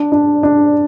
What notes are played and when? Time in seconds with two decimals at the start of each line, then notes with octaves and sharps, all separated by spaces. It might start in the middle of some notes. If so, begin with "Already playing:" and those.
Already playing: D4
0.12 D4
0.43 D4